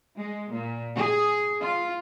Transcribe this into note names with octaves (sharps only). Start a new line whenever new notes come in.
G#3
A#2
G#4
F4